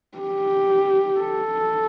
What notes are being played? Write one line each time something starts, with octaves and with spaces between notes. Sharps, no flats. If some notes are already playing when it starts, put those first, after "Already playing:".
G4
A4